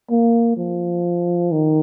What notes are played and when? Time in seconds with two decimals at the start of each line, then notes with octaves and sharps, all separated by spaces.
0.10 A#3
0.57 F3
1.52 D#3